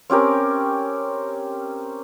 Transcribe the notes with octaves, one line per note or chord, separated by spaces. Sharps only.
C4 C#4 G4 A#4